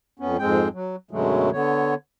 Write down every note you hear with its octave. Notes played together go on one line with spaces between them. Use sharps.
F2 B3 C#4
F2 G#2 G#3 C4 G5
F#3
F#2 B2 D3 F#3 G#3 A3
D3 B3 C#5